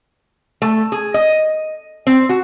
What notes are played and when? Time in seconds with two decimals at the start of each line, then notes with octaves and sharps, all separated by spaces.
0.62 A3
0.92 G#4
1.14 D#5
2.07 C4
2.29 F#4